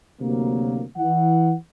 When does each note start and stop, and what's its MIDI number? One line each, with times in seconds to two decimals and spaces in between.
0.20 0.82 38
0.20 0.82 48
0.20 0.82 54
0.20 0.82 58
0.97 1.53 52
0.97 1.53 78